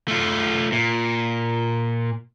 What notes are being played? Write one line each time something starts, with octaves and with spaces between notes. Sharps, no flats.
A3 F4
A#2